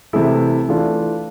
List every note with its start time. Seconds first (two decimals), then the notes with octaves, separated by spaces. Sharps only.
0.13 C3 E3 A3 E4
0.68 E3 A3 D4 F4